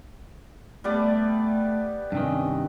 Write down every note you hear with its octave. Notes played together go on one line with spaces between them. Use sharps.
G3 A3 B3 D5
G2 C3 D#3 C#4